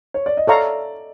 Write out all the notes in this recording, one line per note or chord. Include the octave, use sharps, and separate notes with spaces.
C#5
D5
D#5
A4 C#5 D5 E5 F5 A#5 C#6